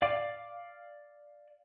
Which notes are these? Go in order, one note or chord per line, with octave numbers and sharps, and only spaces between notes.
D5 F5 D6